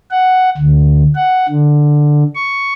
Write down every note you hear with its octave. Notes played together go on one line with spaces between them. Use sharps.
F#5
D2
F#5
D3
C#6